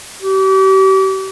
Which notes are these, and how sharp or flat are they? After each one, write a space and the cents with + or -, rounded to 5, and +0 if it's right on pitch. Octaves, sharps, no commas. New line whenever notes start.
G4 -40